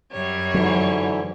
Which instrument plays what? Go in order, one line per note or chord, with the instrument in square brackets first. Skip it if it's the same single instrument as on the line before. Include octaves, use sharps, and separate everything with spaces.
[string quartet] F#2 G3 C#5
[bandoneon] G#2 D3 E3 [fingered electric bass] F#3